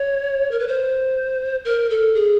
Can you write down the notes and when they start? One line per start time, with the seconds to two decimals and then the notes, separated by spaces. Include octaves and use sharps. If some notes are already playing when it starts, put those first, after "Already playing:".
Already playing: C#5
0.51 A#4
0.59 B4
0.68 C5
1.65 A#4
1.90 A4
2.15 G#4